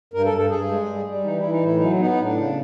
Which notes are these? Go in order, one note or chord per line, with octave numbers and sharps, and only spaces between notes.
G2 A#4
A4
G2
A4
G2 G#4
G#3
G3
G3
E3 D#4
E4
E3
D#4
A2 E4
F#3 D#4
B3 D#4
D#4
A2
D4
C#3